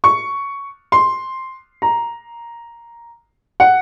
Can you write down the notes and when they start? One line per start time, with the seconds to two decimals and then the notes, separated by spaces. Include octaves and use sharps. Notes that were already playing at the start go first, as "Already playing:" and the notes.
0.04 C#6
0.92 C6
1.82 A#5
3.60 F#5